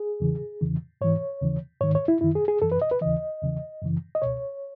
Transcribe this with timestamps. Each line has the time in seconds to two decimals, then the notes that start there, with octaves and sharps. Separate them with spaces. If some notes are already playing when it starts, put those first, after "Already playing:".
Already playing: G#4
0.20 E2 C#3 E3
0.61 E2 C#3 E3
1.01 G#2 E3 C#5
1.41 D#2 C#3 E3
1.81 G#2 D#3 C#5
1.95 C#5
2.08 E4
2.21 F#2 D#3 E4
2.35 G#4
2.48 G#4
2.62 F#2 E3 A4
2.72 B4
2.82 D#5
2.91 B4
3.01 D#2 C#3 E3 D#5
3.42 E2 C#3 E3
3.81 F#2 C#3 E3
4.15 D#5
4.22 C#2 B2 C#5